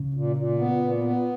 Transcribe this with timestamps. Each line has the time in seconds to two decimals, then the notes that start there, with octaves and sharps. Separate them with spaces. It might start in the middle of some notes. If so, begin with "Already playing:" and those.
Already playing: C#3
0.14 A#2
0.36 A#2
0.59 B3
0.81 A#2
1.03 B3